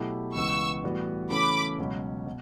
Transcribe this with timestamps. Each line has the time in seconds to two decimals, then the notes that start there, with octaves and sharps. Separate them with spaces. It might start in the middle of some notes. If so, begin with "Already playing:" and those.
Already playing: B2 F#3 A3 E4 G4
0.35 C#2 C#3 E3 B3 C#6 E6
0.84 A2 E3 G3 B3 F#4
1.30 C#3 E3 A3 C#4 B5 D6
1.79 C#2 B2 F#3 C#4
2.26 B2